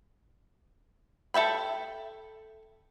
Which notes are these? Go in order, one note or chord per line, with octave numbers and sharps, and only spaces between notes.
A4 E5 G5 B5